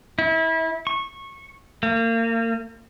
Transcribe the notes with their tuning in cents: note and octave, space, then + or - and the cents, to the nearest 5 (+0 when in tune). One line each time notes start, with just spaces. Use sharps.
E4 -30
C#6 -15
A#3 -35